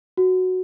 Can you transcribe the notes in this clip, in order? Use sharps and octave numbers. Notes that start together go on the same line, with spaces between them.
F#4